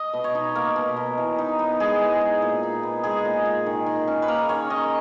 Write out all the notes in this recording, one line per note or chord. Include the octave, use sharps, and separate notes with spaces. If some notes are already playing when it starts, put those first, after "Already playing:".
Already playing: D#5
B2
C#5
D#4
A#3 A#4
B2
B2
E3
D#4
B3
G#3 G#4
E3
D#4
A#2
D#4
B3
G#3 G#4
A#2
D#4
D#3
D#3
C#4
B4
A#3 A#4
D#3 C#5
D#3 D#5